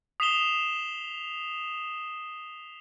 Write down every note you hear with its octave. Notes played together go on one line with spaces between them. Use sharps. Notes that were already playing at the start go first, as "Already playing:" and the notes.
D#6 B6 C7 E7 F7 G7